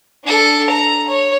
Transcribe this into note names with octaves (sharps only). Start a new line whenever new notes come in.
D4 A4
A#5
C#5